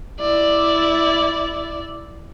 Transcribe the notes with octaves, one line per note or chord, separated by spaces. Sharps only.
E4 D5